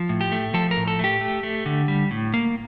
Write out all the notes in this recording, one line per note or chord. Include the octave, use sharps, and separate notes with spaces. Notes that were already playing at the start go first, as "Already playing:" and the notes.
Already playing: F3
A2
G4
A3
F3 A4
A#4
A2
A4
A3 G4
A3
A3
D3
G3
A2
A#3